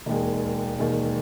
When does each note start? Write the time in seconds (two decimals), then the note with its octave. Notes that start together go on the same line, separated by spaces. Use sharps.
0.06 E1 D#2 D#3 G#3
0.78 E1 D#2 D#3 G#3